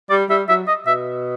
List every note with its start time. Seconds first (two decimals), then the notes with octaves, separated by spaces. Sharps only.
0.10 G3 D5
0.30 G3 E5
0.49 F#3 E5
0.68 D#5
0.86 B2 E5